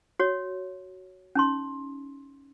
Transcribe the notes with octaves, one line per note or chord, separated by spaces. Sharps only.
F#4 C#5
C#4 D#4 C6